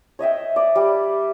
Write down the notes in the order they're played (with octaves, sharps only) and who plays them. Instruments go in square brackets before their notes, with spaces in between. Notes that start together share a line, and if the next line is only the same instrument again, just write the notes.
[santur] C#5 D#5 E5 G5
D5
G3